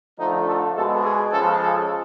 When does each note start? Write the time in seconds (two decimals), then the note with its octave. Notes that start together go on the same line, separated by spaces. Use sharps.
0.18 D3 F3 A3 D#4
0.47 A4
0.75 B2 G#3 A4
1.03 G#4
1.31 C#3 F3 G#3 A4
1.60 A4